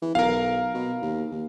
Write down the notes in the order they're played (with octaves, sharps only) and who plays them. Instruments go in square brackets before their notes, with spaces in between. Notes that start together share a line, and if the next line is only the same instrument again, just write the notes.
[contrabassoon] E3
[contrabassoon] B1 [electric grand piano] A#4 F5
[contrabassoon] B2
D#2
D#2